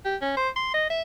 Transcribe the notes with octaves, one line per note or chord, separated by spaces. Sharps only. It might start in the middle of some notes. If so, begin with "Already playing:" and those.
G4
C#4
C5
C6
D#5
E5